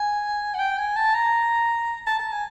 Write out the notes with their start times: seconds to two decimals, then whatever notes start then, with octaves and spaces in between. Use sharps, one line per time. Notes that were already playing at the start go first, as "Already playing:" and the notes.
Already playing: G#5
0.54 F#5
0.59 G5
0.78 G#5
0.96 A5
1.15 A#5
2.07 A5
2.19 A5
2.32 G#5